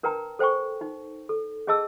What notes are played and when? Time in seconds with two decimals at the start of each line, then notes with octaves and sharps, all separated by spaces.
0.03 D4 A#4 B4 G5 A5 A#5
0.39 A4 C5 G5 G#5 C#6
0.81 D#4
1.29 A4
1.67 C#4 G#4 D#5 A5 E6